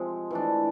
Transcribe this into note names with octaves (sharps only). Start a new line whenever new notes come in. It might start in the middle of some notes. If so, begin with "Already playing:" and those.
Already playing: C3 F3 G#3 C4
E3 A3 D4